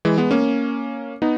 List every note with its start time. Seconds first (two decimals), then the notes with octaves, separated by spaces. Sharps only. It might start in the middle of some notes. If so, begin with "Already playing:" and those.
0.05 E3 G#3
0.18 G#3 B3
0.31 A#3 C#4
1.22 B3 D#4